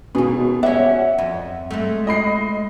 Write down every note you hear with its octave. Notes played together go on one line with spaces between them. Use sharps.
D#2 B2 G#4
C#4 D5 E5 F#5
F2
G#3 A3
D#5 B5 C7